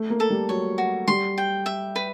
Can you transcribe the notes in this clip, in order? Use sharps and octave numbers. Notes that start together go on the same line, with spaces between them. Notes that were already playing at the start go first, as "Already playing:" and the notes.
Already playing: A3
A#3
A4
G3
F#3 C#5
F#4
G3 C6
G5
E5
B4